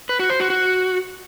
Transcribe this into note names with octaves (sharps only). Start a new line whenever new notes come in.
B4
F#4
C5
F#4
F#4